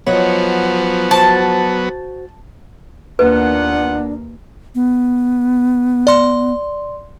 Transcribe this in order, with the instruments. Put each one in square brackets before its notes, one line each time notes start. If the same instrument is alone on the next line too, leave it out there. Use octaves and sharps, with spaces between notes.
[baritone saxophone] F3 [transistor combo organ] F#3 B3 [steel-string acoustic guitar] C#5 D#5 F#5
[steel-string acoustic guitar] F#4 C5 [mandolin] A5
[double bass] D#2 A#3 [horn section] B3 F4 F#5 [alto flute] D4 [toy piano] B4
[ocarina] B3
[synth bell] D5 C6